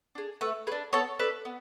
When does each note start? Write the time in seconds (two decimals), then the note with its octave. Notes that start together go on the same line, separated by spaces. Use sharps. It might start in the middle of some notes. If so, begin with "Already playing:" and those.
0.15 D4 G#4
0.41 A3 B4
0.67 G#4 B4
0.72 D4
0.93 B3 A4 C#5
1.19 D4 A4 B4
1.45 B3